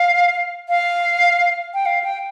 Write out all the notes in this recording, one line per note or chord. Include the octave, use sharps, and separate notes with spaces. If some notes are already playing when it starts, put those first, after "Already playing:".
Already playing: F5
F5
G5
F5
G5